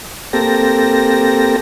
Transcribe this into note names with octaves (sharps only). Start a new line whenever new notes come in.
A#3 C4 G4 A4 A#6